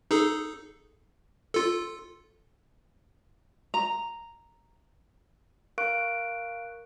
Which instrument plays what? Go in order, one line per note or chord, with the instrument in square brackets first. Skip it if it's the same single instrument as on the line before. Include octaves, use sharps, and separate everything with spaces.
[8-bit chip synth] D#4 G#4 A4
F4 A4
[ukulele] A#5
[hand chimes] A#4 F5 C#6 F#6 D7